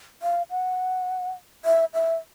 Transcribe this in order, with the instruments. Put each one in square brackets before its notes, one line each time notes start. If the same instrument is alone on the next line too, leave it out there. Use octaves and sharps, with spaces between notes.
[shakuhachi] F5
F#5
E5
E5